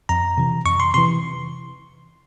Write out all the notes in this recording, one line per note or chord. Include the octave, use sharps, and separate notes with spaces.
F2 A#5
C3 E3
F2 C#6
C6
C3 E3 C6